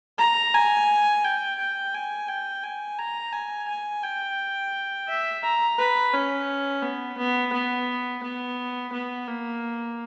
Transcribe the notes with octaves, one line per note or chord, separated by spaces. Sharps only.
A#5
G#5
G5
G5
G#5
G5
G#5
A#5
G#5
G#5
G5
E5
A#5
B4
C#4
B3
B3
B3
B3
B3
A#3